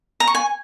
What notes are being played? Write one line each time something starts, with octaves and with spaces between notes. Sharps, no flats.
A#5
C#6
G#5